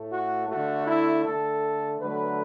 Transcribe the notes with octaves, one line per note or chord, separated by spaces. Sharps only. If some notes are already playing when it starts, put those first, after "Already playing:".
Already playing: A2 A3
F#4
D3 A3 F#4
E4
D3 A3 A4
D3 F#3 A3 B4